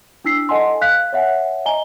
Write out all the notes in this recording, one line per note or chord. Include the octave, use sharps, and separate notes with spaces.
D4 E4 E6 B6 C7
A4 D#5 F#5 G#5 A5 C6
F5 F#6 B6
C#5 E5 F#5 G#5
D#5 G#5 A#5 G7